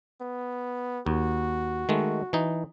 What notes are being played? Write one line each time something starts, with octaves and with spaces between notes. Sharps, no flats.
B3
D#2 F#4
D#3 G#3 A3
E3 D#4